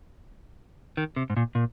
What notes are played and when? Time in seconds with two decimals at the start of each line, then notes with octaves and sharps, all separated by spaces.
0.97 D#3
1.16 C3
1.30 G#2
1.36 A#2
1.55 A#2